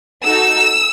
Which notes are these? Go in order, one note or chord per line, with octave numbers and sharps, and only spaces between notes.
D#4 F#4 A4 E6